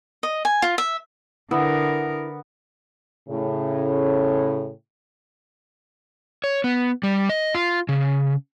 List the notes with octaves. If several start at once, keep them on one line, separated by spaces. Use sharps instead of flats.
D#5
G#5
F4
E5
D3 B3 E4 A#4
A2 C#3
C#5
B3
G3
D#5
F4
C#3